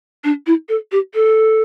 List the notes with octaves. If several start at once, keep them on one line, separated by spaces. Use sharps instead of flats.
D4
E4
A4
G4
A4